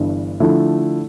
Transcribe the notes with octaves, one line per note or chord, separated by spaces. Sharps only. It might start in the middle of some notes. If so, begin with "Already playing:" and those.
Already playing: G1 G2 E3
D3 F3 A3 E4